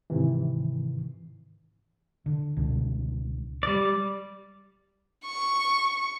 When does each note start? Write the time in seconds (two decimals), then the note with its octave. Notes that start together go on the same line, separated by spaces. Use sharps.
0.10 G#2 C3 D#3 E3
2.26 D3
2.57 C#2 B2 D3
3.63 G3 D5
5.25 C#6